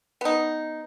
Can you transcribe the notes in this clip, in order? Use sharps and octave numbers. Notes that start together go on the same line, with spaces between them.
B3 D#4